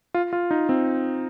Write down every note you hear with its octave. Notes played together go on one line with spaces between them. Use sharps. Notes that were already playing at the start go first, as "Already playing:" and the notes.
F4
F4
D#4
C4